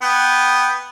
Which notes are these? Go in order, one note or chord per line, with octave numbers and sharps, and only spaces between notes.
B3 G5